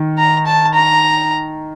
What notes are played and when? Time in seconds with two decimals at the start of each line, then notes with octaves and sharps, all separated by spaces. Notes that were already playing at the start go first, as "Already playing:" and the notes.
Already playing: D#3
0.18 A#5
0.46 A5
0.74 A#5